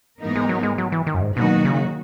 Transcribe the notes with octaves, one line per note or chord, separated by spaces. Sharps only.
G#2 E3 B3 D#4 A#4
G#3
F#3
G#3
F#3
E3
D#3
F#2
G#2
B2 D#3 F#3 A#3 D#4 F#4
C#3